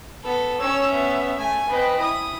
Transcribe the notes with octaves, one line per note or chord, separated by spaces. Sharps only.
B3 A4
C#4 C#5 E6
B3 E5
A3 G#5
C4 B4 D#5
E4 D#6